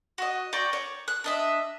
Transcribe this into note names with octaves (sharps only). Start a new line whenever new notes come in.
F#4 D#5
D5 G5 A#5 C#6
C#5
F#6
D4 D#5 E5